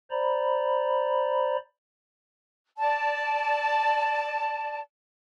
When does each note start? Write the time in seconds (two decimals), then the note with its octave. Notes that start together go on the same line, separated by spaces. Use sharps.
0.11 C5 D5 A#5 B5
2.78 D5 A5